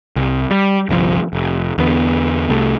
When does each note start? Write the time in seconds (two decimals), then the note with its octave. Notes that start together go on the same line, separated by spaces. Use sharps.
0.16 C2
0.51 G3
0.89 G1 C2 B2 F3
1.33 F1
1.78 E2 D3 B3
2.50 C2 A3